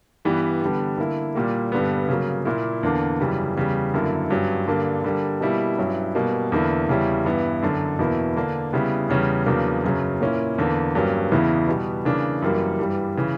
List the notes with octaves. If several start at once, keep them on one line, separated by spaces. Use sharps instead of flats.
G2 E3 G3 B3
D3 G3 B3
D3 A#3 E4
A#2 G3 A#3
G2 D3 G3 B3
C#3 F#3 A#3
A#2 A#3 E4
E2 D3 A#3 D4
F#2 C#3 E3 G3
E2 C#3 G3
F#2 D3 A#3 E4
G2 F#3 C#4
G2 D3 A#3
D3 G3 A#3
B2 G3 A#3 E4
G2 F#3 C#4 E4
B2 G3 A#3
E2 D3 A#3 E4
E2 C#3 G3 C#4 E4
G2 E3 B3 E4
F#2 D3 F#3
E2 B2 A#3 E4
D3 A#3 D4
C#3 G3 B3 E4
E2 C#3 G3 C#4
E2 C#3 F#3 A#3 D4
F#2 C#3 F#3
A#2 A#3 C#4 E4
E2 D3 A#3
G2 F#3 A#3 C#4
E2 C#3 E3 B3 E4
B2 G3 B3
C#3 E3 A#3 D4
F#2 E3 G3 A#3
G2 E3 G3
C#3 E3